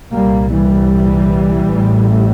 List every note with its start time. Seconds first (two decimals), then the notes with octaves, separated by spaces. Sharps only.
0.12 C2 A#2 G3 A#3
0.51 E3 G3
1.68 A1 A2